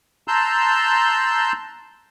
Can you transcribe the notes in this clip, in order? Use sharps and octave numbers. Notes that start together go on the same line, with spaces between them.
A5 A#5 C6 E6 F#6 G6